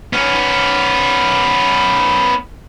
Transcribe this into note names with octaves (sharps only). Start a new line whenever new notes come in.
B3 C#4